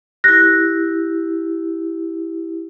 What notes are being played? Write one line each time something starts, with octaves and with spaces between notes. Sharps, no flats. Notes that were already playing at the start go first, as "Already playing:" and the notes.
E4 G4 F#6 A#6